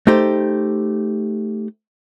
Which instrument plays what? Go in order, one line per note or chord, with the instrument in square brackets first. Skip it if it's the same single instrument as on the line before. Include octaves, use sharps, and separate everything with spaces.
[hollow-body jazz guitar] A3 D#4 G4 C5